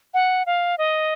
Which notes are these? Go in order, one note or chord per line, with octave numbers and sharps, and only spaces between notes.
F#5
F5
D#5